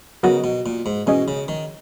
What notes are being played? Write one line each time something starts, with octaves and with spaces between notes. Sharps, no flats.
C#3 F#3 B3 F#4 A#4 D#5
B2
A#2
G#2
B2 E3 G#3 C#4 G#4 D#5
C#3
D#3